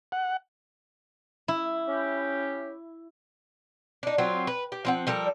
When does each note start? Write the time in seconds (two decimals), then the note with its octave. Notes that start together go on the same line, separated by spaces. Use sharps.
0.12 F#5
1.48 E4
1.87 C#4 G4
4.03 D4 D#4
4.18 F#3 C4 F4
4.47 B4
4.72 G4
4.85 F3 C4 F#5
5.07 F3 G3 A4 A#4